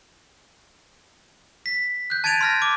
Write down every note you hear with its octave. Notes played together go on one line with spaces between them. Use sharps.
B6
F#6 G6
A5 G#6 A6 D7 D#7 F7
C6 F6 A#6
D6